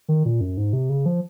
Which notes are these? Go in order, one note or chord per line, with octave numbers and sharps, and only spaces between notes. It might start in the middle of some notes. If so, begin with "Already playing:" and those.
D#3
A#2
F#2
G#2
C3
C#3
F3